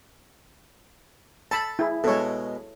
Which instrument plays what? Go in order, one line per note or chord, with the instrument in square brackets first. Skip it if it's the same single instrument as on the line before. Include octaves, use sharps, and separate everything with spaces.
[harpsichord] A4 [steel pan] A5 B5
[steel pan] E4 G#4
[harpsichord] B2 G#3 [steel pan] A4 C#5